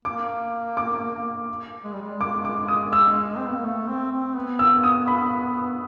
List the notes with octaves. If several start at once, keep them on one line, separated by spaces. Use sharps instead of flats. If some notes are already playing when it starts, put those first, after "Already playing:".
A#3 D6
D6
G#3
G3
G#3
D6
D6
D#6
E6
C4
B3
A#3
A3
C4
C4
B3
E6
D#6
B5